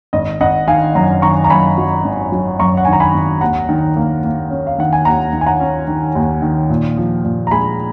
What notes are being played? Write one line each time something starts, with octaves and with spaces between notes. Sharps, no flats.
G#1 D#5
G#1 D#5 F#5
D#3 F5 G#5
F#2 F#5 A#5
D#3 A#5 C#6
A#5
F#2 G#5 B5
F#3
G#1
F#3
F#2 A#5 C#6
F#5
D#3 G#5
A#5
G#5 B5
G#1
D#2 F#5 A#5
D#3
A#3
A#3
C#4
F5
D#3 F#5
G#5
D#2 F#5 A#5
D#3
G#5
F#5 A#5
C#4
D#3
D#2
D#3
A#2
F3
A#2
A#5
G#3 G#5 B5